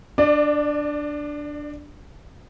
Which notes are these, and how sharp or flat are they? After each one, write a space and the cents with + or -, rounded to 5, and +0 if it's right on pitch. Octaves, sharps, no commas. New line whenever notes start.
D4 +0 D5 +30